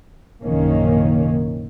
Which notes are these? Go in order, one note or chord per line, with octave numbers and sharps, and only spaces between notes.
A#1 F#2 C3 D#3 A#3 C#4